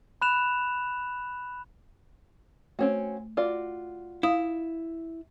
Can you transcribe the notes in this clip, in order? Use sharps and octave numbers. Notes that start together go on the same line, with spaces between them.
B5 F#6 E7 F7
A3 C4 C#4 F#4
F4 F#4 D5
E4 F5 D#6